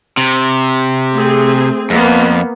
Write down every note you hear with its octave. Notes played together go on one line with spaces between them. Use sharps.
C3
A3 C4 G#4
F2 A#3 B3